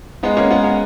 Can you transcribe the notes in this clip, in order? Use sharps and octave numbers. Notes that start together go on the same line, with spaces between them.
G#3 B3 D#4
A#3 C#4
G#3 B3
B3